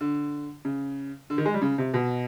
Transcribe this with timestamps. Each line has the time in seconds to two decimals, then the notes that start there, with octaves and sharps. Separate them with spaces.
0.01 D3
0.65 C#3
1.30 D3
1.38 D#3
1.46 G#3
1.54 G3
1.62 C#3
1.78 C3
1.94 B2